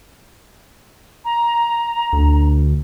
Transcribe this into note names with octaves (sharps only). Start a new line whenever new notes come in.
A#5
D2